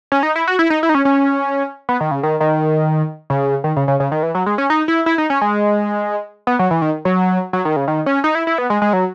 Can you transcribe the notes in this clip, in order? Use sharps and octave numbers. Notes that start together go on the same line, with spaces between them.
C#4
D#4
E4
F#4
E4
D#4
E4
D#4
C#4
C#4
B3
D#3
C#3
D#3
D#3
C#3
D#3
C#3
C#3
C#3
D#3
E3
F#3
G#3
C#4
D#4
E4
E4
D#4
C#4
G#3
B3
F#3
E3
D#3
F#3
F#3
D#3
C#3
D#3
C#4
D#4
E4
E4
B3
G#3
G#3
F#3